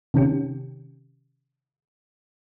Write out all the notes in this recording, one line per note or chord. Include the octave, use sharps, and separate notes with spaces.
C3 D#3 C#4 G4